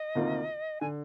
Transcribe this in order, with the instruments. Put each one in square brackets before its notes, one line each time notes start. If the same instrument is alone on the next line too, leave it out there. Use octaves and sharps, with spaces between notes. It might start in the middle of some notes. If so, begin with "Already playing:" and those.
Already playing: [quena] D#5
[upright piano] D2 C3 D#3 A#3 F4
[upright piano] D3 [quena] G#5